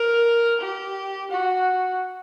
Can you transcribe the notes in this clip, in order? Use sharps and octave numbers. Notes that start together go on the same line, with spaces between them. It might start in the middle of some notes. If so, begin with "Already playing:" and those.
Already playing: A#4
G4
F#4